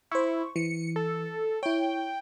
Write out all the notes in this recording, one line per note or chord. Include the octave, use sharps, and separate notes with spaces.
E4 C5 C#6
E3 C#7
A4
E4 C#5 G5